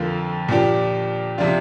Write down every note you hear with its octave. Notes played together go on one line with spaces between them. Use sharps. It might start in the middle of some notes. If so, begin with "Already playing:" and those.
Already playing: F2 D3 F3 A#3 F4
A#2 F3 D4 G4
C3 F3 D4 F4